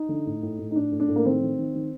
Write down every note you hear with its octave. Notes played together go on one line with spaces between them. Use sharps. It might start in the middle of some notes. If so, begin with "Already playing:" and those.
Already playing: D#4
D3
A2
A2
A2
D#4
A2 D4
A2
D4
A2
A#3
D#3 C4
D#3
D#3
D#3